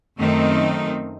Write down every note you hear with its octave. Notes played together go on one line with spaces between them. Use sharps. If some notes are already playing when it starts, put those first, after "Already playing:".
F#2 D#3 A3 C4 D#4